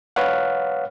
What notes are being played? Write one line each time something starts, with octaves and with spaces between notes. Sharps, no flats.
B4 C#5 F5 F#5